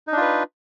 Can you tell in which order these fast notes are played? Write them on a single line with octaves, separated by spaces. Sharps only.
D#4 D4 F4 B4